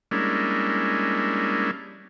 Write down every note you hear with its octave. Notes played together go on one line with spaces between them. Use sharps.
G3 G#3 A#3 C#4 D4 E4